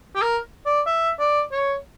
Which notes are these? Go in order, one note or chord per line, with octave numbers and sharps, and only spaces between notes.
G4
A#4
D5
E5
D5
C#5